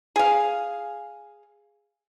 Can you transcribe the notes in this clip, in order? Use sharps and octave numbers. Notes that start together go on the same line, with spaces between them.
G#4 F5